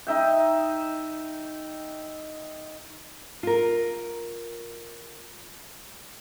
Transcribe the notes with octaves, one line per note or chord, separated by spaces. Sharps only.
D#4 E5 G5
F4 A#4